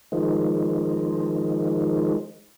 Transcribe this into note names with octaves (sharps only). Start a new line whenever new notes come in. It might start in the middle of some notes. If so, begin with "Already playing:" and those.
D#3 F3 G#3